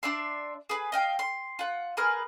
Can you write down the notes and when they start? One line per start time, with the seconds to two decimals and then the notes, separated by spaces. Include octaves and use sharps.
0.03 D4 D5 E5 C6
0.69 G#4 B4
0.92 D#5 F5 G5
1.19 C6
1.59 F4 F#5
1.97 G#4 A#4 B4 F6